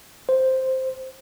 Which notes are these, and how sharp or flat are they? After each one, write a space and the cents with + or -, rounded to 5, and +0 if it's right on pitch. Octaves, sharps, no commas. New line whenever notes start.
C5 +0